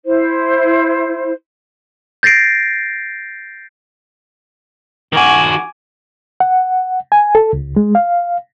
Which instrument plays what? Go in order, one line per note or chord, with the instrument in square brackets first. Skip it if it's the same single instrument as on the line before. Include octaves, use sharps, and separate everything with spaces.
[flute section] E4 C5
[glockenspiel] G6 A6 A#6 C7 D7
[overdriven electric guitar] D#3 F#4 [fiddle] G#5 D6
[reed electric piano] F#5
G#5
A4
C#2
G#3
F5